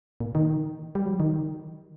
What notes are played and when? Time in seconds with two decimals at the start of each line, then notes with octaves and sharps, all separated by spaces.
0.20 A#2
0.35 D#3
0.95 G3
1.05 F#3
1.20 D#3